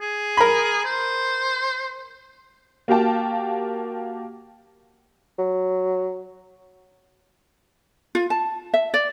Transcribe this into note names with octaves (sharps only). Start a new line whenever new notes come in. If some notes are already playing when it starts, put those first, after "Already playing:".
G#4
A#4 B5
C5
A#3 F#4 G4 F5 G5 A5
F#3
F4
A5
E5
D5